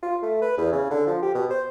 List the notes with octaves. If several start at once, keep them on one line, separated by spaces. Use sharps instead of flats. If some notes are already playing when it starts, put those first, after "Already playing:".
F4
A3
B4
E2
C#3
D3
F3
G4
B2
C5